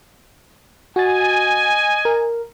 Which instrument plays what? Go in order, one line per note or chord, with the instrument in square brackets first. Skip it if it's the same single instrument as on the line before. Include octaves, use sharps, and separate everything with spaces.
[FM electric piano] F#4 A6 [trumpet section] D#5 G#5
[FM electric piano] A#4